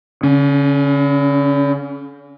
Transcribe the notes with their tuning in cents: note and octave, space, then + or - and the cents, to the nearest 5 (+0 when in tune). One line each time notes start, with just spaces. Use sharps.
D3 -45 C#4 +0